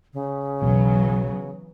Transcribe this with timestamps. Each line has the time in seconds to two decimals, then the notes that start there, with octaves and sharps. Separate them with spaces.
0.13 C#3
0.62 E1 B1 E2 E3 F#3 B3